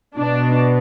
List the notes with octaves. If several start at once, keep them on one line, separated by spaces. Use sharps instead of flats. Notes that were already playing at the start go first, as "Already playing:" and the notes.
B2 D4